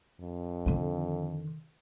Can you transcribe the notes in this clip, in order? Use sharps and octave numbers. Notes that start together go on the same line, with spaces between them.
F2
D3 D#3